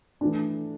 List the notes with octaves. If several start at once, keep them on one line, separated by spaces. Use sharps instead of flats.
E3 A3 D4